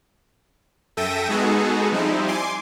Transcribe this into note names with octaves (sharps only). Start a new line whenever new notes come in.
F#2 A4 E5 G5 A#6 D#7
G#3 B3 D#4 F#4 G#4 A4
F3 G3 C4 D#4 E4
G#5 C6 D6